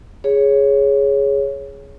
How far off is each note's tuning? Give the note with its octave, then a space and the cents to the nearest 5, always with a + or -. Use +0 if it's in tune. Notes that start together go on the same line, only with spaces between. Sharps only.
G#4 +0 C#5 +0